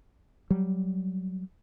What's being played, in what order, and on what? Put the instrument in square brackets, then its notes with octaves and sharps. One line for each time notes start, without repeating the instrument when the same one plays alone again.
[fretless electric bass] F#3 G3